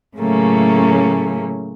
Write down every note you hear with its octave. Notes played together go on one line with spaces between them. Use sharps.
A2 C#3 F#3 A3 A#3 C#4